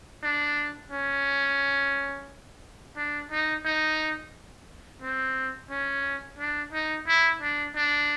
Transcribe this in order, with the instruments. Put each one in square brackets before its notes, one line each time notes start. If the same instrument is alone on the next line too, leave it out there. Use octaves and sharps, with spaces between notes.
[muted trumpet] D4
C#4
D4
D#4
D#4
C4
C#4
D4
D#4
E4
D4
D4